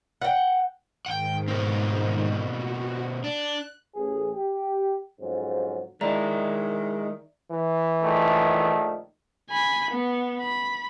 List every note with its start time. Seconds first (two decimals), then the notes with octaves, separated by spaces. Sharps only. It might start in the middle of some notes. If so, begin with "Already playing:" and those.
0.22 F#5 G5
1.06 G#2 D#3 F#5 G5
1.48 B2 A#3 C4
2.47 F#4
3.24 D4 F#6
3.96 A1 G#4
4.34 G4
5.21 F2 G#2 C#3 F#3
6.01 D#3 G#3 E4 D5 E5 A#5
7.51 E3
8.02 A#1 D#3 A3
9.50 G#5 B5
9.91 B3
10.40 B5